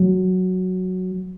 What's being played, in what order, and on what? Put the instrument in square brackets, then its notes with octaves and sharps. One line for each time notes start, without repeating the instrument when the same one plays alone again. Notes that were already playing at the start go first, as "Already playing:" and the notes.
Already playing: [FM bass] F#3